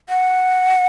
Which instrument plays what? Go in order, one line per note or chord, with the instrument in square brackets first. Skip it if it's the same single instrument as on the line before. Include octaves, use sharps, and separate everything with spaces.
[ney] F#5